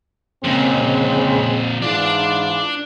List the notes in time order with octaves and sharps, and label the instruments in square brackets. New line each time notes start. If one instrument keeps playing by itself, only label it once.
[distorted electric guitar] F2 A#2 [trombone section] C#3 G#3 C4
[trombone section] G#2 E3 F4 [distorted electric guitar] D4 D5